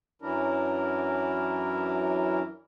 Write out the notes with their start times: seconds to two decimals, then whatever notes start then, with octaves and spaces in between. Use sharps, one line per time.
0.22 F#2 E3 F#3 D4 E4 A#4